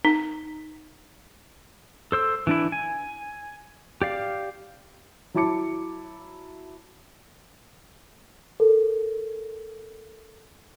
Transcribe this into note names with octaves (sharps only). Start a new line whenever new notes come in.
D#4
A4 C5 E6
E3 D4 E4
G#5
G4 D5 F5
F#3 E4 A5 D6 C#7
A4 A#4